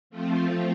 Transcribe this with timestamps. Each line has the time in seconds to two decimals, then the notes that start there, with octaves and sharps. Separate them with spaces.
0.10 F3 A3 C4 F4